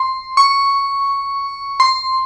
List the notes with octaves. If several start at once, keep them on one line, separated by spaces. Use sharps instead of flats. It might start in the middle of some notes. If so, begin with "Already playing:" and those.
Already playing: C6
C#6
C6